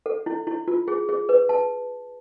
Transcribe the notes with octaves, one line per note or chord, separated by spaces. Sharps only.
A4
E4
E4
F4
G#4
G#4
B4
A5